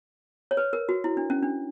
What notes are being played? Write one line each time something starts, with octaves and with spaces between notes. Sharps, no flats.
C#5
B4
A#4
F#4
E4
D4
C#4
D4